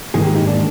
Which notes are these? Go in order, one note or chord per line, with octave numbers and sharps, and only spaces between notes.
G#2 D#3 A#3 G#4
G4
D#4
D4